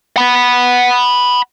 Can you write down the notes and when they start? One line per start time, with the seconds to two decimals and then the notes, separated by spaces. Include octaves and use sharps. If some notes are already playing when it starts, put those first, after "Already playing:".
0.17 F#5 B5